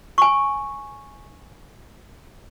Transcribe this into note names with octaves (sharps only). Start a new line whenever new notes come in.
G#5 C#6